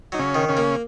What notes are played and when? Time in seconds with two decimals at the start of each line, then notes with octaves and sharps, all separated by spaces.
0.12 F#3 D#4
0.19 C#3 C#4
0.35 D#3
0.49 C#3 C#4
0.57 A#3